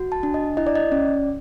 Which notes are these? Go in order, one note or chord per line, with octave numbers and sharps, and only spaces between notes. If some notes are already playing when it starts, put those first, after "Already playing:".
Already playing: F#4
A5
D4
D#5
E4 D#5
D5
D#5
C#4 D5